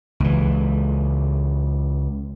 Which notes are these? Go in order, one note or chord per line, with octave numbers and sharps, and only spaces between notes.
C#2 E3